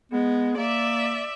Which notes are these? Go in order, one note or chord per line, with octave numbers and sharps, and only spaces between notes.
G#3 B3
A#3 D5 E5